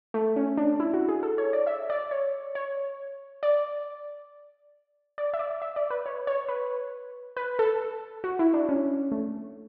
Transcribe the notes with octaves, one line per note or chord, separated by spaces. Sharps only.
A3
C#4
D4
E4
F#4
G#4
A4
C#5
D5
E5
D5
C#5
C#5
D5
D5
E5
D5
E5
D5
B4
C#5
C#5
B4
B4
A4
F#4
E4
D4
C#4
A3